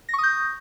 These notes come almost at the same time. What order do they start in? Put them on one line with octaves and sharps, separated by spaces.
A#6 C#6 D#6 G6